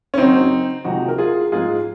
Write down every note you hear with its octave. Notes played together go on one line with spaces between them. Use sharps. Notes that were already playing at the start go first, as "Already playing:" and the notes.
C#4
F#2 C#3 F#3 C4 D#4
F2 C3 F3 G#3 D#4 F#4
A#4
F4 G#4
G#2 F3 G#3 F4 G#4